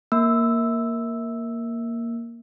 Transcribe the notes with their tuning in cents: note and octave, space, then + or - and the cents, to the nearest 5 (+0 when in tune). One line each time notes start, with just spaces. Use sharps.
A#3 +0 E6 +0